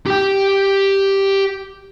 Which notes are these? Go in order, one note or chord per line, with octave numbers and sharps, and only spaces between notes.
G4 G5